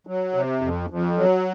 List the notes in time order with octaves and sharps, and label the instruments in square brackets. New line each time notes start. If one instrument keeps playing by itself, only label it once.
[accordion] F#3
C3
F2
F2
F#3